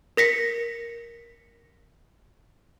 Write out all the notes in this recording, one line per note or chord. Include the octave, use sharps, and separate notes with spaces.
A#4 A#6 B6 C#7